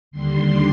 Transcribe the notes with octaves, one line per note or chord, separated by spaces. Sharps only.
D#2 D3 G3 C6